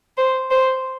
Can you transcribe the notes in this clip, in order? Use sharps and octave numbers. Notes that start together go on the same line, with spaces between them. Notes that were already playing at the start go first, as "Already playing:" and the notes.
C5
C5